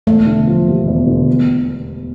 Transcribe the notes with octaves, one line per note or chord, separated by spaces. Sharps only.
E1 A3
D3
F3
D#2
E1
D3
E2